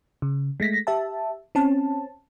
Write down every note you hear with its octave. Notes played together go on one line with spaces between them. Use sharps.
C#3
G#3 A3 A#6 B6
G4 E5 A5
C4 C#4 A5